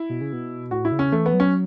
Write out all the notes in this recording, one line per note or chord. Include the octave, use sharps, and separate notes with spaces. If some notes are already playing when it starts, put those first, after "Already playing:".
Already playing: E4
B2
C#3
B2
A2 F#4
E4
C#3
C#4
E3 A3
B3
F#3
C#4